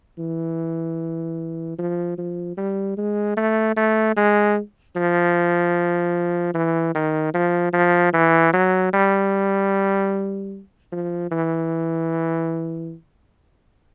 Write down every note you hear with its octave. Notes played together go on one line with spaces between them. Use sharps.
E3
F3
F3
G3
G#3
A3
A3
G#3
F3
E3
D#3
F3
F3
E3
F#3
G3
F3
E3